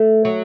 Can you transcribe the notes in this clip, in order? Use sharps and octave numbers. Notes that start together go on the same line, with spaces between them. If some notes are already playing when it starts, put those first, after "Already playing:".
Already playing: A3
F#3